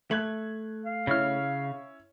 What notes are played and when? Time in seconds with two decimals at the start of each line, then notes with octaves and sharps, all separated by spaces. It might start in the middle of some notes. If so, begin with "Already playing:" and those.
0.11 A3 F#6 G#6 F#7
0.85 F5
1.07 C#3 C#4 E4 C#5 F6